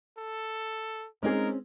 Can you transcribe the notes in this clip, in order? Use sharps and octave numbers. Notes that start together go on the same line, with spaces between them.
A4
G#3 C4 C#4 D#4 G#4 A#4